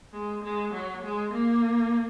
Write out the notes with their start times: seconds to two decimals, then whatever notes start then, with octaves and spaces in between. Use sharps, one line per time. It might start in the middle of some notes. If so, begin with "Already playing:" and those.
0.13 G#3
0.43 G#3
0.73 F#3
1.02 G#3
1.33 A#3